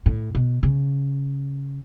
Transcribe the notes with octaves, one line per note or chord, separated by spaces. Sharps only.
A2
B2
C#3